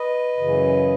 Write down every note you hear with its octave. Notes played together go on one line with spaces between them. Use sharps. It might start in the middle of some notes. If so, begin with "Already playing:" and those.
Already playing: B4 D#5
F#2 C#3 E3